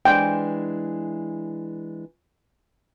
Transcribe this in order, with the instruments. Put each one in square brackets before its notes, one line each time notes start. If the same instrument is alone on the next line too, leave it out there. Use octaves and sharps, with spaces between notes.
[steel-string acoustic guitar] E3 G#3 D4 [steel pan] G5